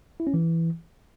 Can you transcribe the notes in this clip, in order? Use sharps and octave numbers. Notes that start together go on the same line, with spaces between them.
E4
C#4
E3